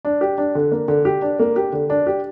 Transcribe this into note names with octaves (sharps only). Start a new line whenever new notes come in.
D4
G4
D4
D3
A#3
D3
G4
D4
A#3
G4
D3
D4
G4